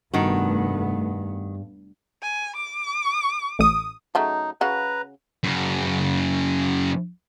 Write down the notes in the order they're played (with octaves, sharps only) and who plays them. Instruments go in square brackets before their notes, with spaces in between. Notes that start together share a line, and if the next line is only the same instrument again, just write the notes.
[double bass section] F1 A3 B3 [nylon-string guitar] G2 [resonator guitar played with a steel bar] D#3 F#4
[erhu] G#5
D6
[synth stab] A1 D#6
[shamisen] C#3 F#3 A3 [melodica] D#4
[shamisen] C#3 F#4 [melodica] B4 A#5
[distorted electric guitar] F#2 C#3